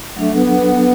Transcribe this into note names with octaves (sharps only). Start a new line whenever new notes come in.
F#3 A3 D4 A4
B3